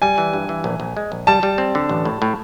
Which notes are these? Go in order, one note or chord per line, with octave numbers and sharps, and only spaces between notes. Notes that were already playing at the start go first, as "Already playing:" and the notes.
G3 G#5
E3
G2
E3
A#1
A#1
G#3
A#1
G3 A5
G3
C4
D3
A1
A2
A2